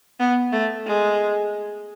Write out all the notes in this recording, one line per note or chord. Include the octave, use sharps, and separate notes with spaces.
B3
A3
G#3